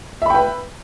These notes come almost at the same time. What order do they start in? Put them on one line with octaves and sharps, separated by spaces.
E5 B5 G5 B4